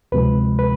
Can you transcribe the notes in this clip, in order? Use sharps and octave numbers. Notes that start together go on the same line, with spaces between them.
D2 C3 F3 G#3 B4
B4